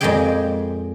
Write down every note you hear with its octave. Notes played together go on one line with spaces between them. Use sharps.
F2 A#2 G#3 G4 G#4 G5